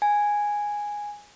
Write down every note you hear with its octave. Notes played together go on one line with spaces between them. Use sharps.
G#5